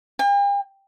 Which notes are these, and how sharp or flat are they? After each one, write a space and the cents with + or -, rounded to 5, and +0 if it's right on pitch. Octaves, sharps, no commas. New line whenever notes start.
G5 +45